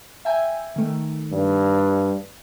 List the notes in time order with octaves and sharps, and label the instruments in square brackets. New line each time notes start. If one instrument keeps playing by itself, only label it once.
[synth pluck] E5 G5 G#5
D#3 A3
[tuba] G2